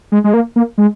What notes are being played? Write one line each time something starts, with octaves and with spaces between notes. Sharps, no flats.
G#3
G#3
A#3
A#3
G#3